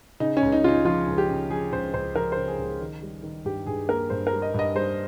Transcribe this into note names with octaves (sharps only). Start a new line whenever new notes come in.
C#3 D#4
C#4
C#2
D#4
C#3 D#4 F4
F3 F4
C#2
G4
C#3
F3 G#4
C#2 C5
C#2 C5
F3 A#4
C#3 C5
G#4
C#2
D#3
G3
D#3
G2 G4
G2 G#4
A#3 A#4
G2 C5
A#4
G3
D#5
G2 D#5
G3 C5